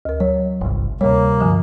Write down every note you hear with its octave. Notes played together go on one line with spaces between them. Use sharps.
D2 A#4
F#3 C#5
G1 C2
D2 C3 G3 A#3 C#5
G2 D3 F3